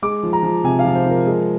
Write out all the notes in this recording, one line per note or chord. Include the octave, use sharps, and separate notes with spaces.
G#3 D6
F3
A#5
F3
C3 G#5
F5
F3
C5
F3 A#4
G#3